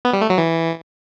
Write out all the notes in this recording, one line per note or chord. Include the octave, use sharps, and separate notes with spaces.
B3
G3
A3
F#3
E3